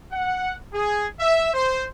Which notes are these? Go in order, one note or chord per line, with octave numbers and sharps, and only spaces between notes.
F#5
G#4
E5
C5